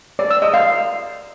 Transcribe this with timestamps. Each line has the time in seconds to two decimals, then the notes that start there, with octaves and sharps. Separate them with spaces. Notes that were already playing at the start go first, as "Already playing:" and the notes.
0.19 D5
0.31 E6
0.42 D#5
0.54 F5